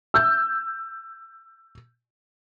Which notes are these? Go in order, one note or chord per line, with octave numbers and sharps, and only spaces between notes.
E6 G6